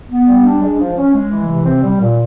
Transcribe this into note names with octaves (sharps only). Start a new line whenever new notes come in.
B3
G3
D4
G#3
F3
C#4
G#3
E3
C3
C4
G3
A#2